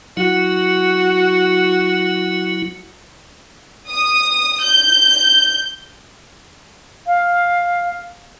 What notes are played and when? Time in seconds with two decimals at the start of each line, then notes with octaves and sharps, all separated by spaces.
0.17 F#3 E4 F#4
3.90 D#6
4.64 G6
7.07 F5